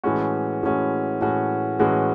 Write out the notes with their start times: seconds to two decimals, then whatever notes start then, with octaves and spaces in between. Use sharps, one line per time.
0.04 A2 E3 G#3 C#4 F#4
0.63 A2 E3 G#3 C#4 F#4
1.21 A2 E3 G#3 C#4 F#4
1.80 A2 E3 G#3 C#4 F#4